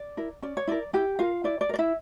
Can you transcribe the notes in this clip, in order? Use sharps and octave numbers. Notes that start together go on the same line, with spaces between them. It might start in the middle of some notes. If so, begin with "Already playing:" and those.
Already playing: D5
E4 A#4
C#4 D5
C#5
E4 A#4 D5
E4 G4 G5
F4 A#4 F5
E4 D5
D5
A#4
D5
E4 E5